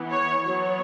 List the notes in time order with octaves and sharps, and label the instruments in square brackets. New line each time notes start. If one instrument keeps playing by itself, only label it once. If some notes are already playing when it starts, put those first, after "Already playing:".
Already playing: [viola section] E3 B3
C#5
F#3 B3 C#5